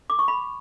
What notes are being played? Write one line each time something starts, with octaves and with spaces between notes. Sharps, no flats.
D6
C#6
B5